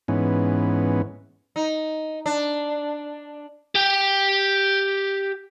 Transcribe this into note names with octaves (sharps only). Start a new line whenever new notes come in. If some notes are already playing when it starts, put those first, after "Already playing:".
G#2 E3 B3 C#4
D#4
D4
G4 G5